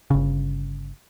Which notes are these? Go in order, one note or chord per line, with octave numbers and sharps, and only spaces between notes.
G1 C#3